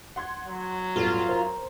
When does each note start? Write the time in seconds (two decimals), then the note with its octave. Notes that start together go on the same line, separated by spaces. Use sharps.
0.16 F#5 C6 G#6
0.46 F#3
0.96 A1 E2 G2 F4 A4
1.29 A#4 C5 A#5